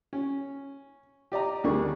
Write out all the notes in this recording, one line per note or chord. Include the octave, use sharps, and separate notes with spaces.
C#4
G4 D5 D#5 A#5
D2 D#3 G3 D4 G#4 C#6